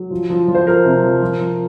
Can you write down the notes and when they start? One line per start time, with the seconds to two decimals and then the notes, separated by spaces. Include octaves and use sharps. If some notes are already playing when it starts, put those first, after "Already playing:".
Already playing: F#3
0.11 F3
0.30 F3
0.48 F3
0.55 C5
0.66 F3 A#4
0.85 C3
1.03 F3
1.22 F3
1.39 F3